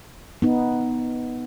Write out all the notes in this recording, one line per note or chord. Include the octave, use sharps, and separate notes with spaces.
B3 D#4